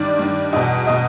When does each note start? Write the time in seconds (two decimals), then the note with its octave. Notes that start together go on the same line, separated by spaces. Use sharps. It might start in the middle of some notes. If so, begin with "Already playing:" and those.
Already playing: G2 D#3 D5
0.19 G2 D#3
0.53 E2 B2 D#5
0.87 B2 D#5